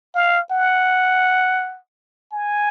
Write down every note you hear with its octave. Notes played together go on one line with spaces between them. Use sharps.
F5
F#5
G#5